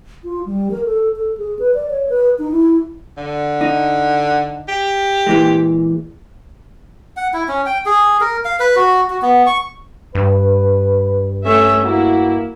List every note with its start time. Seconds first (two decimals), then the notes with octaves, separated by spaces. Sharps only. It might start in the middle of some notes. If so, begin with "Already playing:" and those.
0.24 F4
0.46 G3
0.71 A#4
0.85 A4
1.16 A4
1.38 G#4
1.59 B4
1.75 D5
1.90 C#5
2.09 B4
2.39 D#4
2.52 E4
3.17 D3
3.61 D#4
4.68 G4
5.27 A#2 E3 G#3
7.17 F#5
7.34 E4
7.48 C#4
7.66 G5
7.86 G#4
8.21 A#4
8.45 F5
8.60 B4
8.76 F#4
9.10 F#4
9.22 B3
9.47 C#6
10.15 G2 B4
11.45 A3 C#4 E5
11.84 A#3 E4 F#4